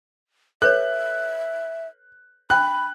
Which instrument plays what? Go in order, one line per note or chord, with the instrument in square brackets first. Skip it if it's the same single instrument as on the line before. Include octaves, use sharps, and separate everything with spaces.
[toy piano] A4 B4 C#5 [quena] E5 [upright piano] F#6
[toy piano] D4 G5 [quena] B5 [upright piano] F#6